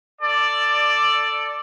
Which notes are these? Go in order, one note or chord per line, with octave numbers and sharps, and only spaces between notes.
A4 D5